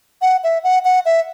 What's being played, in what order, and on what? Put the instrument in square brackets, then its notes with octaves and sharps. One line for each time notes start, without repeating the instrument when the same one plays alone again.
[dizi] F#5
E5
F#5
F#5
E5